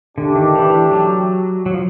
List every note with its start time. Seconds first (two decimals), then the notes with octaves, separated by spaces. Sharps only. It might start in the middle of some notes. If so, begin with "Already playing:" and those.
0.18 D3 A3 D4 G4
0.36 D#3
0.55 E3
0.91 F#3
1.66 F#3
1.73 F3